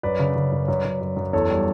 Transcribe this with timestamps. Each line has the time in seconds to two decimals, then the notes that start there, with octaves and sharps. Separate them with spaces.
0.03 F#2 B4 D5
0.19 C#3
0.36 C#3
0.52 F#2
0.68 F#2
0.85 F#2
1.01 F#2
1.16 F#2
1.33 E2 A4 C#5
1.50 G3